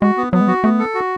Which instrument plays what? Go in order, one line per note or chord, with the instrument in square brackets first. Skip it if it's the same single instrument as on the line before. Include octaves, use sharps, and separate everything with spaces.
[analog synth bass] G#3 [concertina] F#4
[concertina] B3
[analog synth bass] F#3 [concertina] B3
[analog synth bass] G#3
[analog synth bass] F#3 [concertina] F#4
[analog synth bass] A3 [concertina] B3
[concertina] A4
F#4